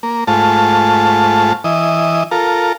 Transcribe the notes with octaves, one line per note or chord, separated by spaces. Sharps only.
A#3
G#2 A3 F4 A5
E3 D#5
F4 A4 A#4